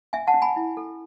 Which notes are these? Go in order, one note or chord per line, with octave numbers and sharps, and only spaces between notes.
C#4 E5 G#5
F#5 A5
C#4
G#5 B5
E4
A4